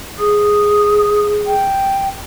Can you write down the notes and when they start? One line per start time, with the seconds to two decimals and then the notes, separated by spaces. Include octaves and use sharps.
0.19 G#4 D#6
1.46 G5